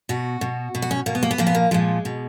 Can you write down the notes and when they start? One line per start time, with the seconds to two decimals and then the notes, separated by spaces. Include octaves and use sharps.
0.09 B2 F#4
0.41 B2
0.75 B2
0.82 F#4
0.91 C#4
1.06 B2 A#3
1.15 B3
1.23 A#3
1.31 B3
1.38 A#2 F3 A#3
1.47 B3
1.55 A#3
1.71 A#2 F3 G#3
2.05 B2